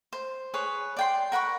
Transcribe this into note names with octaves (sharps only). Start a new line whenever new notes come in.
C5
G#4 B4 C#5
D5 G5 C6
A#4 F#5 B5 C#6